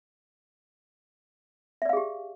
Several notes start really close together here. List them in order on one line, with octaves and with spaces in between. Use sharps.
E5 D5 F5 G#4 G4